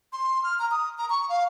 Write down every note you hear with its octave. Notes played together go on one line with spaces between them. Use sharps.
C6
F6
A#5
D#6
A#5
C#6
F5